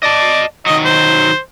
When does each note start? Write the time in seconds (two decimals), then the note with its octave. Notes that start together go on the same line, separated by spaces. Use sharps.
0.03 D5 D#5 A5
0.66 D#3 F#3 D#5
0.85 C5